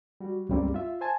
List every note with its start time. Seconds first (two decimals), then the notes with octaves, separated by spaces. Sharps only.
0.20 G3 F#4
0.49 C#2 G2 C#3 G3 A#3 C4
0.74 F4 E5
1.01 C5 G#5 A5